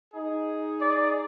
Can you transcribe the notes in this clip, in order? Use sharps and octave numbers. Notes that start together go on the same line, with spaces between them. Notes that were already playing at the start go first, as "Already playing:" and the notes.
D#4 G#4
D5